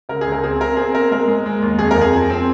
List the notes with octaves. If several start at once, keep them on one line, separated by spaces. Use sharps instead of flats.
C#2 A#4
G#4
C#2
A#4
C4 G#4
C4 A#4
C4 G#4
C4 A#4
G#3 A#4
G#3
G#3
D#2
F2 G#4
A#4
F2
G#4
F3
C4